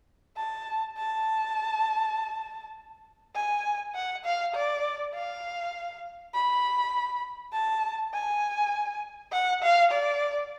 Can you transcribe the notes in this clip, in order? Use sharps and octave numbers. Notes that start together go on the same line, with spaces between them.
A5
A5
G#5
F#5
F5
D5
F5
B5
A5
G#5
F#5
F5
D5